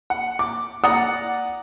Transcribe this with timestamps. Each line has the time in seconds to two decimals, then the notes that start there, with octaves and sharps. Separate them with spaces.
0.10 F#5
0.39 D6
0.84 D5 F#5 A#5 D#6